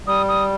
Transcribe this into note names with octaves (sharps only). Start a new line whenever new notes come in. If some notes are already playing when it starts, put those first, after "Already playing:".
G3 D#6
D#6